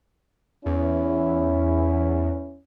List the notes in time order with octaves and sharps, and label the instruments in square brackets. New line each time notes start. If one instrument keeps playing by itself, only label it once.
[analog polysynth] E2 [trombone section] C#4 E4